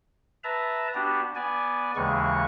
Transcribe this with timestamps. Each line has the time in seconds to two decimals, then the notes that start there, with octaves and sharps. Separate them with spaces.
0.44 B4 E5 A5 A#5
0.95 B3 D4 F#4 G4
1.36 B3 D5 G#5
1.96 D#2 C#3 E3 G#3 C#6